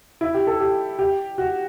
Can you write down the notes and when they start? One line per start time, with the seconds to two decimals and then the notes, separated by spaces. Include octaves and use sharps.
0.21 E4
0.34 G4
0.47 A4
0.60 G4
0.99 G4
1.38 F#4